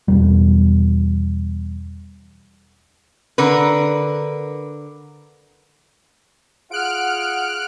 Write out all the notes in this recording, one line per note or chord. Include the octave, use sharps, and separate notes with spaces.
E2 B2 G3
D3 A#4 B4
F4 G#4 F#5 F6 F#6 D7